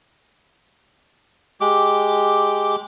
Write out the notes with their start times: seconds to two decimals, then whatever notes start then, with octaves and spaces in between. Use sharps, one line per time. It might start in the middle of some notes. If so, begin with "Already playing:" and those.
1.61 G#3 G4 D6